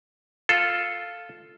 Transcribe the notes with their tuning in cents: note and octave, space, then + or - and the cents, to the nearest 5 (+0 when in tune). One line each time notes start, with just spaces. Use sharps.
F4 +0 A4 +0